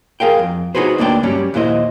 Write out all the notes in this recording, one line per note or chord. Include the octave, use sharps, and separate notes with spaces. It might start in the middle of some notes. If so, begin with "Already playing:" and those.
G#4 A#4 F5 G5
F2
D#4 F#4 G#4 B4 C5
D2 A#3 D4 D5 G5
G2 F#3 G3 C#4
D#2 A#2 E4 C5 D#5